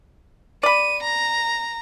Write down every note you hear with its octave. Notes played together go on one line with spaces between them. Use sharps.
D5 B5 D#7
A#5